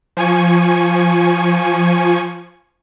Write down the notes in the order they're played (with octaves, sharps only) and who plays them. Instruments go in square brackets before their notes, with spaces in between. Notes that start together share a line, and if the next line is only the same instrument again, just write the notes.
[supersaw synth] F3 G#5 C#6